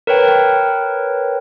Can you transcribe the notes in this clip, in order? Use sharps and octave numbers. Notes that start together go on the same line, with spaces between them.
A#4 B4 C#5 G5